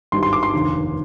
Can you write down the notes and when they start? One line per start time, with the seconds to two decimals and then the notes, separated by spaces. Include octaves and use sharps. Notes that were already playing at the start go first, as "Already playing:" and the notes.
0.12 G#1 G2 D#3 G3 C6
0.23 C6
0.33 D6
0.43 C6
0.53 F1 D#2 D3